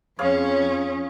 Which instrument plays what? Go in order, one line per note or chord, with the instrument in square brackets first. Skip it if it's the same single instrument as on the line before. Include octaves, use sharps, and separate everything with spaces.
[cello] F2 C#4 [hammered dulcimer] G#4 C#5 F5